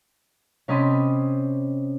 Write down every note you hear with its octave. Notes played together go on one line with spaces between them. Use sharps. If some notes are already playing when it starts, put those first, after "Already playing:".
C3 C#4 D#5 A5 B5 C6